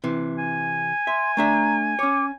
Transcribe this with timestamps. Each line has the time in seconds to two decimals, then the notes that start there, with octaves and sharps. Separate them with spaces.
0.04 C3 E3
0.37 G#5
1.07 E5 C6
1.37 A3 D4 E5 A#5
1.99 C#4 C#5 D6